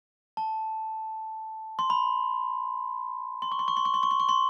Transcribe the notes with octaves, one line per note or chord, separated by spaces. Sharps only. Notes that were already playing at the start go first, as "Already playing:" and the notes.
A5
C6
B5
C6
C#6
C6
C#6
C6
C#6
C6
C#6
C6
C#6
C6